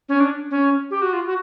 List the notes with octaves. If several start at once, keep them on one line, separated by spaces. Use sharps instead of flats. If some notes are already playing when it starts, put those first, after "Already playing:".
C#4
D4
C#4
G4
F#4
F4
F#4